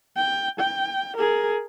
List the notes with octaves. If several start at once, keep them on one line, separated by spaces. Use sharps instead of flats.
G5
G5
G#4 A#4